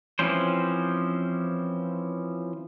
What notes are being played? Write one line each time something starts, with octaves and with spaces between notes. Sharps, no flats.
E3 F3 C4 C#4 C5